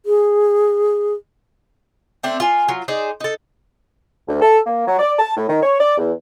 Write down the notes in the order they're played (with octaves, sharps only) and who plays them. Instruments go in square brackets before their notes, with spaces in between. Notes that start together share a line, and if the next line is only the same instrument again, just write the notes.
[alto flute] G#4
[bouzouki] A3 C4 D4
F4 G#5
F#3 F4
D#4 G#4 C5 D5
D#4 A4
[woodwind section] D2
A4
A#3
F#3
D5
A5
A2
D#3
C#5
D5
E2